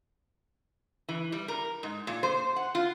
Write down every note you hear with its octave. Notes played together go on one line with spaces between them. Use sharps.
E3
G3
A#4
G#2
A#2
C5
F#5
F4